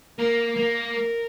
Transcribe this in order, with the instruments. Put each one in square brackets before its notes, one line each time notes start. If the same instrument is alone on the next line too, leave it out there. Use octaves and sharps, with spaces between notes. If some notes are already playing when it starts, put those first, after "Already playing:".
[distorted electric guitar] A#3 [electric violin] A#4
[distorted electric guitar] A#3 [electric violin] A#4
[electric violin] A#4